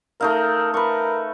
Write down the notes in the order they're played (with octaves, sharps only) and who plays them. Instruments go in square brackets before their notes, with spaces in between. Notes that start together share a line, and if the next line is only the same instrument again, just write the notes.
[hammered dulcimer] A3 D#4 F5 [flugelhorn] A#4
[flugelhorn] A#4 [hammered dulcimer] B4 C#6